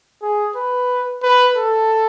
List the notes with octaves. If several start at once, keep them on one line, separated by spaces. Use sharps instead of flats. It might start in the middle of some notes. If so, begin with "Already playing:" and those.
G#4
B4
B4
A4